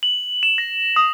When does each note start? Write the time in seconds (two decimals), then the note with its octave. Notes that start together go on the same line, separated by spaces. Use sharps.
0.03 F#7
0.43 E7
0.58 A#6
0.96 D#6